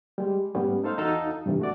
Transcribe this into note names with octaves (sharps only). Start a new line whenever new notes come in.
G3 G#3
G#2 G3 A3 B3 C#4
D#4 A4 C5 F5
E2 D#4 F#4 A4 F5 A5
G2 C3 E3
A3 F#4 D5